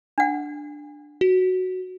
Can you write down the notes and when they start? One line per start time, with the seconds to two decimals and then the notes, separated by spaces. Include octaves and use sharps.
0.18 D4 F#5
1.21 F#4